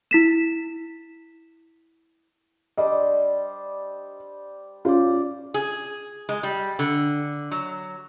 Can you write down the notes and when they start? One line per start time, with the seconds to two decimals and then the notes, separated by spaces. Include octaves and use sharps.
0.11 E4 B6 E7
2.77 G3 D4 C5 D#5
4.85 C#4 F4 C5 D5
5.54 G#4
6.29 G#3
6.43 G3
6.79 D3
7.51 F#3